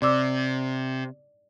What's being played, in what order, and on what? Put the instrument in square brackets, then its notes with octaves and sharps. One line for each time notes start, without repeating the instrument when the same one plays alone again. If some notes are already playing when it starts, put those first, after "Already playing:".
[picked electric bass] C3 [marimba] D5 D6 E6